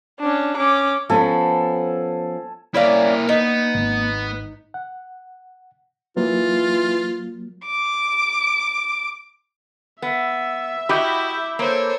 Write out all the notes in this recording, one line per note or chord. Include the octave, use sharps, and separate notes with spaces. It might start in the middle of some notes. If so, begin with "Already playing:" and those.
C#4 D4
C#4 D6
F3 B3 C#4 A4 G#5
A#3 C#4 E4 A#4 D5 F5
B3 D#4
G#1
F#5
E3 F#3 A#3 F4
D6
B3 E5
E4 F#4 G4 D#5 B5 D6 G6
A#3 A4 C5 C#5 E6